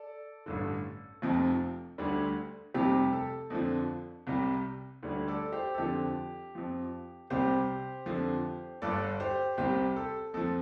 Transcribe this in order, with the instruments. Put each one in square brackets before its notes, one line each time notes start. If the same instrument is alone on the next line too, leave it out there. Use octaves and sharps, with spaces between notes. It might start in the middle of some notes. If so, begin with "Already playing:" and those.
Already playing: [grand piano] A4 D5
A1 G2 D3 A4
F1 F2 C3 F3
D2 D3 G3
F1 F2 C3 G3 G4
A4
F2 D3 F3
C2 C3 G3
D2 D3 G3
A4 D5
G4 C5
A4
F2 D3 F3 G4
F2 F3
C2 C3 G3 G4 C5
F2 D3 F3
G1 G2 D3 A4 D5
G4 C5
C2 C3 G3 G4 C5
A4
F2 F3 A4